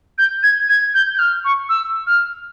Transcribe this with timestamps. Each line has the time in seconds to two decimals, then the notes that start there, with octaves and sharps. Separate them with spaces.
0.18 G6
0.43 G#6
0.69 G#6
0.94 G6
1.15 G6
1.19 F6
1.45 C#6
1.69 E6
2.07 F6